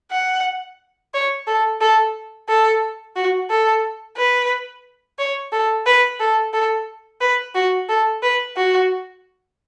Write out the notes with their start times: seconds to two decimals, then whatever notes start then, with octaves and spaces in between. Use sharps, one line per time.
0.11 F#5
1.14 C#5
1.47 A4
1.81 A4
2.48 A4
3.16 F#4
3.50 A4
4.17 B4
5.19 C#5
5.52 A4
5.86 B4
6.20 A4
6.54 A4
7.21 B4
7.55 F#4
7.89 A4
8.23 B4
8.56 F#4